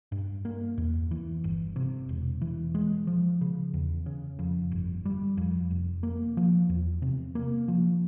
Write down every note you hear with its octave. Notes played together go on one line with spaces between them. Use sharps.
G2
A#3
E2
E3
G1
C3
E1
E3
G#3
F3
C#3
E2
C#3
F2
G1
G3
F2
F1
A#3
F3
E2
C3
A#3
F3